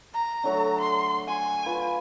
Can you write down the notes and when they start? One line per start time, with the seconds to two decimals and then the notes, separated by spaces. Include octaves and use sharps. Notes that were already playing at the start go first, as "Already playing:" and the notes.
0.13 A#5
0.44 D3 F#3 A3
0.81 C6
1.27 F#5 G#5
1.66 F4 B4